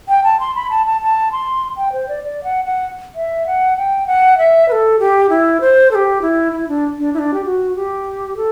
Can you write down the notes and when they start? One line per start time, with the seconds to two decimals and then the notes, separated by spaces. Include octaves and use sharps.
0.09 G5
0.24 A5
0.40 C6
0.55 B5
0.70 A5
0.86 A5
1.02 A5
1.32 C6
1.77 G5
1.92 C5
2.09 D5
2.24 D5
2.44 F#5
2.65 F#5
3.15 E5
3.47 F#5
3.77 G5
4.07 F#5
4.38 E5
4.68 B4
4.72 A4
4.99 G4
5.30 E4
5.61 C5
5.91 A4
5.95 G4
6.22 E4
6.53 E4
6.68 D4
6.99 D4
7.14 E4
7.19 D4
7.34 G4
7.45 F#4
7.76 G4
8.37 A4